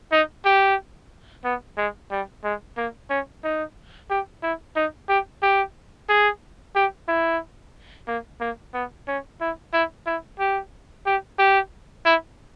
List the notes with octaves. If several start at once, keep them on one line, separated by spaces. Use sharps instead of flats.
D#4
G4
B3
G#3
G3
G#3
A#3
C#4
D#4
G4
E4
D#4
G4
G4
G#4
G4
E4
A#3
A#3
B3
C#4
E4
E4
E4
G4
G4
G4
E4